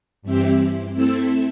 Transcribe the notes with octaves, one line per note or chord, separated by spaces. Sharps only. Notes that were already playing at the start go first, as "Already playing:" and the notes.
G2 E3 C4 E4 G4
A3 C4 E4 A4 E5